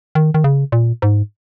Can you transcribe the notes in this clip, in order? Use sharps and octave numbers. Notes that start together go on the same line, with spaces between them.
D#3
D#3
C#3
A#2
G#2